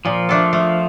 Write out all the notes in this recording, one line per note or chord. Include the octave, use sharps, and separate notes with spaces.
A#2 F3
A3 D4 A4
A3